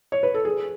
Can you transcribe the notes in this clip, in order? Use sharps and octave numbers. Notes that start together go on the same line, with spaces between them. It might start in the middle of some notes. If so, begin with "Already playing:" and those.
C#5
B4
A4
G#4